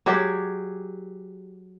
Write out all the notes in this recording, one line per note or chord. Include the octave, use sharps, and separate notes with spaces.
F#3 G#3 G4 D5